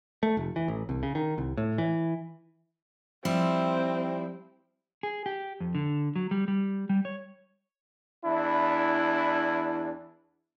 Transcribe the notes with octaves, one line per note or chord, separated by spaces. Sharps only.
A3
F1
E3
A1
C2
C#3
D#3
C2
A2
E3
F3 G3 C4 E4
G#4
G4
F2
D3
F#3
G3
G3
G3
C#5
E2 D4 E4